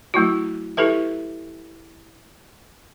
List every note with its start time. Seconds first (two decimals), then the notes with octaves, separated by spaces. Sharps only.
0.14 F#3 A3 E4 F#4
0.77 E4 G4 A4 B4 E5